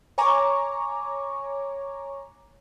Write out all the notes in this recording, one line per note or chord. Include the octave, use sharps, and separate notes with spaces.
C#5 G#5 A#5 C#6 D6